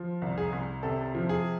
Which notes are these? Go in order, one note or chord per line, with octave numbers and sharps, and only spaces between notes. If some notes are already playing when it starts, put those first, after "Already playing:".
Already playing: F3
C2
G#4
C2
C3 A4
F3
G#4